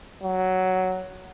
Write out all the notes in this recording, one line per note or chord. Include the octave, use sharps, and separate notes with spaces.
F#3